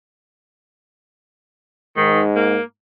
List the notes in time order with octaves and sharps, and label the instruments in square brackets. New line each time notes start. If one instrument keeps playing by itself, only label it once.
[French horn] G#2 [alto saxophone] D#3
[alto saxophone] A#3